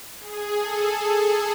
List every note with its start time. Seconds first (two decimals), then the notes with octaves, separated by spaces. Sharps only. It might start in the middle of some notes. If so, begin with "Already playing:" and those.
0.21 G#4
0.58 A4